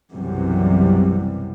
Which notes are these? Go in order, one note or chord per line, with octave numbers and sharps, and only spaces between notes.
B1 F#2 C3 E3 G3